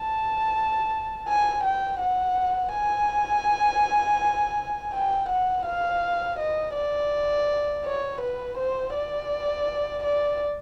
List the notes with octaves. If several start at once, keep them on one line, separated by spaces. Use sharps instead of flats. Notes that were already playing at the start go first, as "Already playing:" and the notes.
Already playing: A5
G#5
G5
F#5
G#5
G5
F#5
F5
D#5
D5
C#5
B4
C5
D5
D5